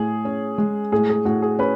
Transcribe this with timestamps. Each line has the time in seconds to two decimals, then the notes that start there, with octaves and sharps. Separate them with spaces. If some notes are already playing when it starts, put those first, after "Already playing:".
Already playing: A2 G#4
0.25 C#4
0.58 G#3
0.92 A2 G#4
1.09 G#4
1.25 A2 F#4
1.42 G#4
1.59 C#4 B4